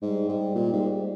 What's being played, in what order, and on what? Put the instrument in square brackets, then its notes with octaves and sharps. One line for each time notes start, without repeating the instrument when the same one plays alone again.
[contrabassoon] G#2 [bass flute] G3
[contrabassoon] G#2
A#2
G#2